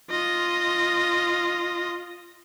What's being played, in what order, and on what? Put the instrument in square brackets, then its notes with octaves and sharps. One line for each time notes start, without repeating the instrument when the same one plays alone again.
[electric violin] F4 D#5